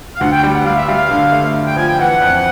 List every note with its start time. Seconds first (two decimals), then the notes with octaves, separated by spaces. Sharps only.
0.15 F5
0.20 D2 F#5
0.32 G5
0.43 G3
0.54 F#5
0.65 G3 F5
0.77 E5
0.87 G3 F5
1.11 D3
1.32 A3
1.54 D3
1.66 G5
1.77 F3 G#5
1.88 G5
1.99 E3 F#5
2.22 F2